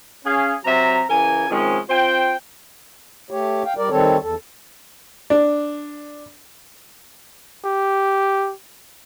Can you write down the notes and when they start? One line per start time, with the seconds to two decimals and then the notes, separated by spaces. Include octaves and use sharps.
0.25 C#4 G#4 F5
0.65 C3 F#3 E5 A#5
1.10 C#3 E3 A#4 G#5
1.49 C3 D#3 F3 G#3 C#4
1.90 C4 F4 C5 G5
3.31 A3 G4 C#5
3.65 F5 G5
3.77 G3 A#4 D5
3.90 D#3 G3 C4 A4 C#5
4.22 E2 A4
5.30 D4
7.65 G4